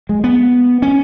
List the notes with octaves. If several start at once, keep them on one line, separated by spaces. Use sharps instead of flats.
G#3
B3
C#4